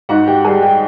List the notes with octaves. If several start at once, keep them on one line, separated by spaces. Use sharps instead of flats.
G#2 F#4 F#5
G4 G5
G3 G#4 G#5
G4 G5